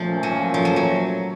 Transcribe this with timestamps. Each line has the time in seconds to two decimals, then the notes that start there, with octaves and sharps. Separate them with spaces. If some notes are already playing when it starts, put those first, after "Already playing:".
Already playing: A#2 F3 A3 C#4
0.23 F#3
0.54 F3
0.65 F#3
0.76 F#3